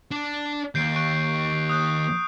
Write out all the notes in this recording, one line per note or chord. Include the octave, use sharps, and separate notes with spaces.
D4
D#2 G6 C7 D7
C#6 F#6 D7
D#6 F#6 G6